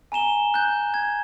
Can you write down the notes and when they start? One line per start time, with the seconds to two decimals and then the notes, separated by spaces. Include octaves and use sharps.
0.12 G#5 A#5 E7 G7
0.54 F#6 G6
0.94 G#6